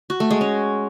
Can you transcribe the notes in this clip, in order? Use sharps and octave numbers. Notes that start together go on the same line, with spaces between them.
F#4
A3
G#3
C#4